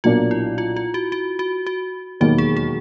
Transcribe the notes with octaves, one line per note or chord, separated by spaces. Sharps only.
B1 A#2 F#3 A#3 D4 F4
E4
F4
F4
F#4
F#4
F#4
F#4
E1 D#2 D#3 F#3 A#3 F#4
G#4
G#4